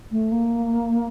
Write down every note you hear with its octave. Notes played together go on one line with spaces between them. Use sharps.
A3
A#3